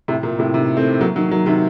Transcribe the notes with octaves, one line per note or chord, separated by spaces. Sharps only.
A2 C3
A#2
A2 C3
C3 D#3
A3 C4
F#3 A#3
D#3 F#3
D#3 F#3
C3 D#3